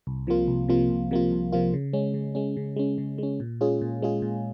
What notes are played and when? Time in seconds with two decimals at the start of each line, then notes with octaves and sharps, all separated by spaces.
0.07 C2
0.27 C3 F3 A#3 F4
0.48 C2
0.68 C3 F3 A#3 F4
0.90 C2
1.11 C3 F3 A#3 F4
1.32 C2
1.52 C3 F3 A#3 F4
1.74 C#3
1.93 G#3 C#4
2.14 C#3
2.35 G#3 C#4
2.57 C#3
2.76 G#3 C#4
2.98 C#3
3.18 G#3 C#4
3.40 A#2
3.61 G#3 C#4 F4 G#4
3.81 A#2
4.02 G#3 C#4 F4 G#4
4.22 A#2